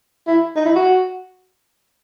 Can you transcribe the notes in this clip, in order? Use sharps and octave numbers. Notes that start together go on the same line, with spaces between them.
E4
D#4
E4
F#4